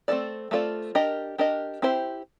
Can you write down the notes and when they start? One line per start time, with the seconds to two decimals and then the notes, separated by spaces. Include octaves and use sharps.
0.08 A3 C4 F4 A4 D5
0.51 A3 C4 F4 A4 D5
0.95 D4 G4 A#4 D#5
1.38 D4 G4 A#4 D#5
1.82 C4 E4 G4 C5